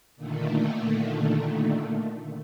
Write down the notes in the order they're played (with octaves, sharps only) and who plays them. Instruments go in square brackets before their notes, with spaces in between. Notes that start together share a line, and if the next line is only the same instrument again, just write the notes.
[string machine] A#2 D3 D#3 A3